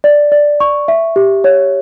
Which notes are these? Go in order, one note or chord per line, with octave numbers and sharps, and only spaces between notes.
D5
D5
C#6
E5
G4
C#5